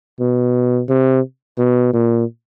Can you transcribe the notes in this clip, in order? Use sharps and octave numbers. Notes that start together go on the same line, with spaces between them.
B2
C3
B2
A#2